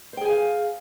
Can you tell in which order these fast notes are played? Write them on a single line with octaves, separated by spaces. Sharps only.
C5 G5 G#4 G#5 F5